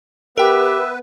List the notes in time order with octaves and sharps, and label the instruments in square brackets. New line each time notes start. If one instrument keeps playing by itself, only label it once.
[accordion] B3 B4 [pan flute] G4 [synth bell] A#4 G5 [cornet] E5